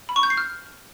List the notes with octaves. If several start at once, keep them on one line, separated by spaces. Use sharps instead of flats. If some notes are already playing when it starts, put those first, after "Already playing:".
B5
C#6
G6
C7
F6